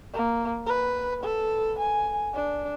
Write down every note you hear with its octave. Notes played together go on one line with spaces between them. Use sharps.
A#3
B4
A4
G#5
D4